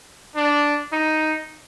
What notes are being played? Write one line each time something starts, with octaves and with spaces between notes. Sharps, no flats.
D4
D#4